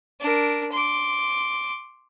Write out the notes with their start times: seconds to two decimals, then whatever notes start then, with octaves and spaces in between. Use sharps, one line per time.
0.20 D4 A#4
0.72 C6 D6